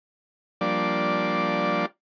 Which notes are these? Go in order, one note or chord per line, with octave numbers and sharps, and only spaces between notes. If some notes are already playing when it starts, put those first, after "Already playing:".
F3 G3 A#3 D4 D5